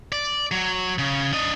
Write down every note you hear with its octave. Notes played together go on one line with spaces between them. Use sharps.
D5
F#3
C#3
D4 D#5